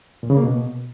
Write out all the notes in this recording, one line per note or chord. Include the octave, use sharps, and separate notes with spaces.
A#2
C#3
A#3
B2